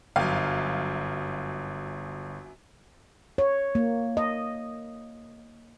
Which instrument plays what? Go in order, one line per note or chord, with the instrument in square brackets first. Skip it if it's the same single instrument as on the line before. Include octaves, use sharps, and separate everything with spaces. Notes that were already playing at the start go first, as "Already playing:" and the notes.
[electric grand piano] G1 [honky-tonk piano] F#2 F5
[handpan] C#5
A#3
D#5